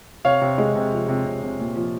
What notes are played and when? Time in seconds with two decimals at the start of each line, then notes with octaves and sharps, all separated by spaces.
0.25 C3 C#5 F5
0.41 C3
0.58 G#3
0.76 C3
0.92 F3
1.09 C3
1.26 C3
1.42 C3
1.59 A#2
1.76 F3